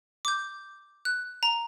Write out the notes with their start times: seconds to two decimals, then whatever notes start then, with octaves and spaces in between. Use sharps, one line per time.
0.25 D6 G6
1.05 F#6
1.43 A#5